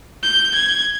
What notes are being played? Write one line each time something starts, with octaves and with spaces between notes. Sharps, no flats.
G6
G#6